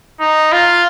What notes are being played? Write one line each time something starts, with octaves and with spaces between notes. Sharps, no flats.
D#4
F4